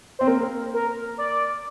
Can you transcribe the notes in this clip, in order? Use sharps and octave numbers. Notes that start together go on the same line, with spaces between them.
C4 C5
A#3 A#4
A#4
D5